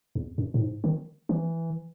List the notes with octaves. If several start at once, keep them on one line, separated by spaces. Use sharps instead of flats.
E2
F#2
A2
G#2
D#3
E3